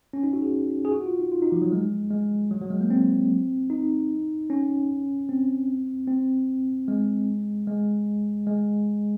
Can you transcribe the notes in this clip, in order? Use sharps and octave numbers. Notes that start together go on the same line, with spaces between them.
C#4
D#4
F#4
G#4
G#4
F#4
F4
D#4
F4
D#4
F3
F#3
G#3
G#3
F#3
F#3
G#3
A#3
C4
D#4
C#4
C4
C4
G#3
G#3
G#3